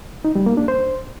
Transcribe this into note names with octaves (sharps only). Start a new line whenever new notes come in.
D#4
G3
A#3
D4
C5